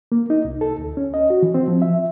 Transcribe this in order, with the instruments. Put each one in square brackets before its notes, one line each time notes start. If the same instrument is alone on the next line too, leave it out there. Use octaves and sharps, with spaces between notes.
[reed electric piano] A#3
D#4
C2
A4
D2
C#4
D#5
F#4
E3
C4
F3
E5